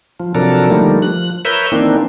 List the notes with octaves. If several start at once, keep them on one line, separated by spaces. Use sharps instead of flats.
F3
C3 F3 F#3 D4 A4 A#4
D3 D#3 F3 G3 A3 A#3
F3 F#6
A#4 B4 C#5 E5 E6 G6
D#3 E3 A#3 C4 D4